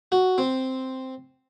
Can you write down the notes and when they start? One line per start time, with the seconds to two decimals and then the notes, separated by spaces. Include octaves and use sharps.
0.12 F#4
0.38 C4